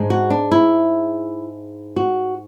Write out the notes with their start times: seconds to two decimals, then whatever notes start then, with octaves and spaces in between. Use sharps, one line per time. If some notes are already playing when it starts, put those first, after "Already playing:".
Already playing: G#2 G#3 D4
0.10 F#4
0.30 D4
0.51 E4
1.96 F#4